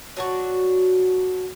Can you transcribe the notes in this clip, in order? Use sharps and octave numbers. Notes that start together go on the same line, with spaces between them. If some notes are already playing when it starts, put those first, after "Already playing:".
F#3 D4 F#4